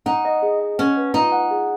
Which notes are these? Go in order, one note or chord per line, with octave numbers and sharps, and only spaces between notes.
D#4 F#5
D#5
G#4
D#5
C#4 F#5
B4
D#4 F4
F#5
G#4